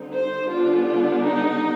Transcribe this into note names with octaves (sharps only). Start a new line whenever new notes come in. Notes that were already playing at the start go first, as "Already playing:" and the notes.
Already playing: D3 G3 C4 D#4
C5
D3 G3 B3 D4 F4
F4
D#4